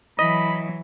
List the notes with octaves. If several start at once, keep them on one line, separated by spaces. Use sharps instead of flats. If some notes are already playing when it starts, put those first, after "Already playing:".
E3 F#3 D#5 B5